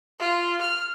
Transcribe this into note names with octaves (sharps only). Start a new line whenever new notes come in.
F4
F6